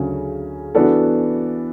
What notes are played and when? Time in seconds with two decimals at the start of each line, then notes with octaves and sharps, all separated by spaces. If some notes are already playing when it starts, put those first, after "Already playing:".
Already playing: D2 C#3 F#3 C#4
0.75 E3 B3 D4 F#4 A4